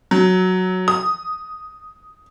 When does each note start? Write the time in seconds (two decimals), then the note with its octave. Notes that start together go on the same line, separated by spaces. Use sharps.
0.11 F#3
0.88 D#6